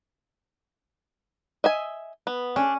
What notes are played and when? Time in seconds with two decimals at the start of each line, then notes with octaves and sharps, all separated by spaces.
1.64 D#5 E5 G#5
2.27 B3
2.56 C#4 D4